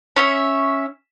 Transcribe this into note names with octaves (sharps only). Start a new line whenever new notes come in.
C#4 C#5 E5